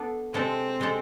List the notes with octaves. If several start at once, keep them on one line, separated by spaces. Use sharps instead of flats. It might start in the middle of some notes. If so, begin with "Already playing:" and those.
Already playing: B3 D4 A4
C3 G#3 C4 D4 A4 C5
C3 G#3 D4 A4 C5